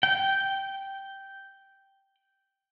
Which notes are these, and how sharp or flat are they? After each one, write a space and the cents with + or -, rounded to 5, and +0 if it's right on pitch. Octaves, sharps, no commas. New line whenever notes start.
G5 -5